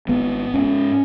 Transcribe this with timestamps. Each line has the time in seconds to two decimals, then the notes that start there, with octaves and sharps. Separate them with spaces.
0.09 G#1 B3
0.54 G#2 C#4